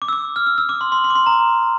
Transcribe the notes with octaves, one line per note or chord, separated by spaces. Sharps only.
D6
E6
D6
F6
E6
E6
D6
C6
C6
C6
D6
C6
A#5